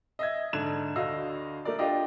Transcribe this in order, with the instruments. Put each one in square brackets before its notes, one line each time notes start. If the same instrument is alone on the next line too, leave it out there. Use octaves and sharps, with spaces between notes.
[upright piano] D#5 E5 G#6
G#2 D3 A4 G#6 E7
D2 D3 F#4 D#5 F5 E6
A3 A#4 D5
D4 F4 G4 D5 D#5